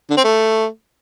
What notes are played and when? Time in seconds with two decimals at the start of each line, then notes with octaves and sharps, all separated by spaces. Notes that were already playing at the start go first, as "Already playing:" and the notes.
0.10 D3
0.17 C4
0.24 A3